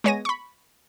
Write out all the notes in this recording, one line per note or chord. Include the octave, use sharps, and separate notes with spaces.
G#3 B3 C#5 G#5 A#6 D#7
B5 C#6